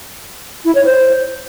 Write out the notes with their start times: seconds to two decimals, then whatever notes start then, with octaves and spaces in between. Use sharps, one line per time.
0.65 E4
0.75 C#5
0.85 C5